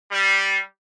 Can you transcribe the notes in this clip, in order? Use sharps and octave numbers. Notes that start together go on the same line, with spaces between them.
G3